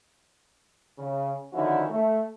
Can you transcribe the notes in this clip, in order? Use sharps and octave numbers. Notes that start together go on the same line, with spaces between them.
C#3
D3 D#3 F3 C#4 E4 F#4
A3